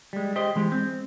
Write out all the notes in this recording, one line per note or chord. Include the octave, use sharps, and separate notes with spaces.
G3 G#3
G4 C5 D#5
E3 G#3 G4
C4